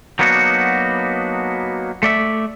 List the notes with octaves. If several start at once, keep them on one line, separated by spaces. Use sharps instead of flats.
F#3 A#3 B3 D4 D#4 F#4
A3 D5 E5